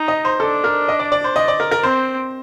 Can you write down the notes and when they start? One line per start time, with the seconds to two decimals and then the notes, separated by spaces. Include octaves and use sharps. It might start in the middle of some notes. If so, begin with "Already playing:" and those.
Already playing: D#4
0.08 D#5
0.25 C5
0.40 D4 A4
0.64 A#4
0.88 D#5
0.99 D5
1.12 D5
1.24 C5
1.36 D#5
1.48 D5
1.60 A#4
1.71 A#4
1.83 C4 C5